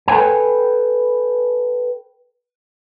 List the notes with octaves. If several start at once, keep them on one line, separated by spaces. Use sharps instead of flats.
A4 B4 C5 D5 G5 G#5